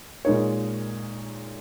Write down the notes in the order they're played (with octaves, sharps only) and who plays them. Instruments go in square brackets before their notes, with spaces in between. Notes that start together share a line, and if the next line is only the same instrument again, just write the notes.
[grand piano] A#2 G#3 D#4 A#4 C#5